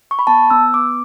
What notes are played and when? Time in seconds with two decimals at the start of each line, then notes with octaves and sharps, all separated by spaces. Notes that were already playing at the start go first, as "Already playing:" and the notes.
0.11 C#6
0.19 B5
0.27 B3 A5
0.50 B3 E6
0.74 B3 D6